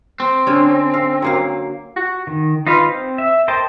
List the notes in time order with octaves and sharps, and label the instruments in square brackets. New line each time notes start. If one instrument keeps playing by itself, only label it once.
[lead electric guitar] C4
[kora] D3 C#4
F5
F#3 A#3 F5
[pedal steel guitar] F#4
D#3
D#4 F4 B4 F5
C4
E5
A#4 C5 D#5 G5 A5